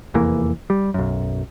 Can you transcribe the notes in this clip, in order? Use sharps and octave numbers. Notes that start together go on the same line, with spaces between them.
F1 E2 E3 A#3
G3
B1 F#2